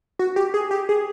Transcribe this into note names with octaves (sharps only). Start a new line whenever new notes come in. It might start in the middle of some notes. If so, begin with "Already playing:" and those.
F#4
G4
G#4
G4
G#4